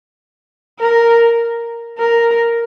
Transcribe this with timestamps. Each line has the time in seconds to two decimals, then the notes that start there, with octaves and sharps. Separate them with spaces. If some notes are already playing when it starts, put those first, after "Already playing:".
0.79 A#4
1.98 A#4